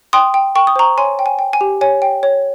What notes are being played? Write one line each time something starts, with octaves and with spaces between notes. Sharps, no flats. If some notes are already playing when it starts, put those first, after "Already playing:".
G5 C6 D#6
G5
G5 C#6
D#6
C5 A#5 C#6
C#5 G#5 C6
G5
G#5
G5
G#5
G4
C#5 G#5
G5
C#5